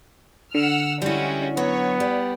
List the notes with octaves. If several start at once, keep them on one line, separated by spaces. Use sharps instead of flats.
D3 F#5 E6 F6
G3 G#3 C#4 E4 F#4
F#3 B3 C#5
G3 D5